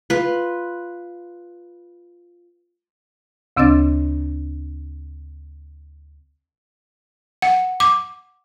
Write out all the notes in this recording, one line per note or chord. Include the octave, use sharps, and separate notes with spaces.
F4 B4
D2 C#3 C4 D4 D#5 A6
F#5
D6